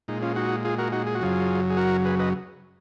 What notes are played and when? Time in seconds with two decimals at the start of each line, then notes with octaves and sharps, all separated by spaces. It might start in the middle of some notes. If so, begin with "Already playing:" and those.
0.08 A#2 G#3 D#4
0.22 C#4 F4
0.36 D#4 F#4
0.65 F4 G#4
0.78 F#4 A#4
0.93 D#4 F#4
1.06 G#4
1.15 F#4
1.21 F#2 C#3 F#3 F4 G#4
1.70 G#4
1.77 F#4 A#4
2.05 G#4 B4
2.19 B4 D#5